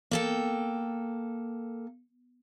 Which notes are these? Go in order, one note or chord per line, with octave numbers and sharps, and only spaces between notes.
A#3 A4 G5